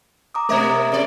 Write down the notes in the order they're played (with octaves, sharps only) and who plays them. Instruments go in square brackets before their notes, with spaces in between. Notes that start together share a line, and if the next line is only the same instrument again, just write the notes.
[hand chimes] A#5 D6 D#6
[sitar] B2 A#3 A#4 [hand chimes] A3 E5 G#6
[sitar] C3 D5